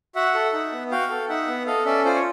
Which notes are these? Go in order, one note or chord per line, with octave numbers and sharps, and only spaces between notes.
F#4 E5 F#5
A4
D#4
B3
F#4 F5 G5
A4
D#4 E5 F#5
B3
A4 D#5 F5
C#4 D5 E5
F4 C5 D5
C#5